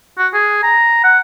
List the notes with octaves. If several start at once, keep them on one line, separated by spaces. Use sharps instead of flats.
F#4
G#4
A#5
F#5